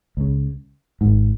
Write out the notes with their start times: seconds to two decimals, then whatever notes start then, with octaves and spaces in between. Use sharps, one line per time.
0.17 C#2 C#3
1.01 G#1 G#2